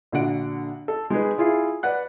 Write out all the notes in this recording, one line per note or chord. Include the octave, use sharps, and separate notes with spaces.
A#1 D3 F#4 F#5 D7
A4
G#3 D#4 G#4 B4
E4 F4 G#4
B4 D5 F#5 F#6